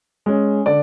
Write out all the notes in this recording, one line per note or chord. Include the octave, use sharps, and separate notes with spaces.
G#3 C#4
D3 D5